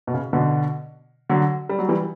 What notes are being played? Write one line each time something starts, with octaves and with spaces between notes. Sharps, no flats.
B2
C#3
B2 D3
D3 F#3
G3
F#3
E3 G3